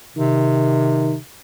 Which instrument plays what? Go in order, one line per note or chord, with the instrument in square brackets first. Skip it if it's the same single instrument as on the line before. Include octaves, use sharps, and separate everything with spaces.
[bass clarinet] C3 [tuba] D#3